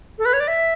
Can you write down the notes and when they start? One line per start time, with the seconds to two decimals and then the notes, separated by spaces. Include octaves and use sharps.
0.18 A4
0.25 B4
0.33 C#5
0.40 D5
0.48 E5